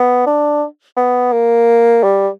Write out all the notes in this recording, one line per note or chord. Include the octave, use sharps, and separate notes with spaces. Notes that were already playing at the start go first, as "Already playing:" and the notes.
Already playing: B3
D4
B3
A#3
G3